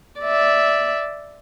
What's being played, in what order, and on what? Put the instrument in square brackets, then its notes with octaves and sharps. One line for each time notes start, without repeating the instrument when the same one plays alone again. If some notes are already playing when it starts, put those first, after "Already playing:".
[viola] D5 E5